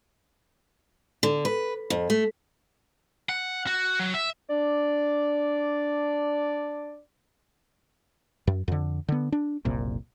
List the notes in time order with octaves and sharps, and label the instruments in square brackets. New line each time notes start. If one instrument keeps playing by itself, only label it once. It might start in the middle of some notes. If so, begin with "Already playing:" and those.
[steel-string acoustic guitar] D3
B4
F2
A3
[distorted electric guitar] F#5
F#4
F#3
E5
[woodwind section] D4 D5
[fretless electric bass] F#2
F2 D3
D3 B3
D4
F#1 C2 A#2